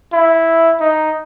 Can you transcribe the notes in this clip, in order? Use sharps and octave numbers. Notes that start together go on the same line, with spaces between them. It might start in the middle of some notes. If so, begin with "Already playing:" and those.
E4
D#4